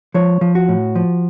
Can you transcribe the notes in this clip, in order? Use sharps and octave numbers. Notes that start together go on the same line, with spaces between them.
F3 C#5
F3
F#4
A2
F3